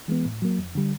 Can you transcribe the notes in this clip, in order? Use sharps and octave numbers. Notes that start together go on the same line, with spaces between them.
E3 G#3 B3
A2
F#3 A#3
F2
D3 G3